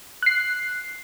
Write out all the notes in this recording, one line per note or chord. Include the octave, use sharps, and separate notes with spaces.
F#6 C7